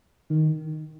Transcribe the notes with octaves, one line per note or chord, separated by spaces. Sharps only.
D#3